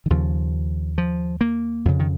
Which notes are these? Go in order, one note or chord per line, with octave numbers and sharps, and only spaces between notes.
D#3
D#2 C#3 F3
F3
A#3
F2 C#3
D#3